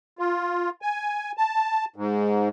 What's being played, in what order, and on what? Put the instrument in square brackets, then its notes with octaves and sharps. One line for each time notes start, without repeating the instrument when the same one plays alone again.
[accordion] F4
G#5
A5
G#2